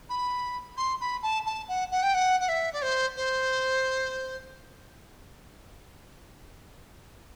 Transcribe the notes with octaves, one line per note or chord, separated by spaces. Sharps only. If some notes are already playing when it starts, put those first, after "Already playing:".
B5
C6
B5
A5
A5
F#5
F#5
G5
F#5
F#5
E5
D5
C5
C5